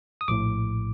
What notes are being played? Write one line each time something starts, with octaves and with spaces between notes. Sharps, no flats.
D#6
A#1 A2 D6